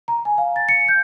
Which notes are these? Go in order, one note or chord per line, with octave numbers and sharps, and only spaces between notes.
A#5
G#5
F5
A6
C#7
G6